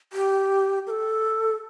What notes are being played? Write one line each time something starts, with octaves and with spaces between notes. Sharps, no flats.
G4
A#4
A4